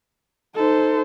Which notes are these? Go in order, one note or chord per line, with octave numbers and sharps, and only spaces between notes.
D#4 A4 C5